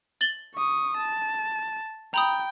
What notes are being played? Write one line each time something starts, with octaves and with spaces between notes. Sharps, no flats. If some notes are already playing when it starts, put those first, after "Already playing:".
A6 F#7 G7
C#6 D#6
A5
G5 A#5 B5 D#6